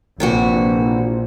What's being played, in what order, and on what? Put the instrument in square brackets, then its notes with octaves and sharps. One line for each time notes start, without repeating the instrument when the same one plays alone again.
[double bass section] A#1 [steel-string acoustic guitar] C3 E3 F#4